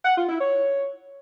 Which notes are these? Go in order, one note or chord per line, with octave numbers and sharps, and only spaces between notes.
F#5
F4
E4
C#5